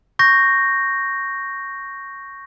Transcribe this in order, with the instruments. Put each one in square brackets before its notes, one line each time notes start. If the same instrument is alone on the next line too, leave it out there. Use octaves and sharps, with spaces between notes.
[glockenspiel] C#6 G6 A#6